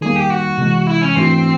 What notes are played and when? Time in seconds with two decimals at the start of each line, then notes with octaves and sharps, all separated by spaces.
0.01 D#3 G3 A#3 G#4
0.16 G4
0.30 F#4
0.58 C3 E3 G#3
0.87 E4
1.01 C#4
1.16 G#2 E3 A3 C4 D4 F#4